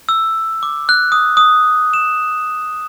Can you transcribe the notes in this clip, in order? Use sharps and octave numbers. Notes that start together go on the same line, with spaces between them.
E6
D6
F#6
D#6
D#6
E7